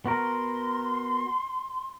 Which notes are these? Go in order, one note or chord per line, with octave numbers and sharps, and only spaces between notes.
B3 F#4 A#4 C6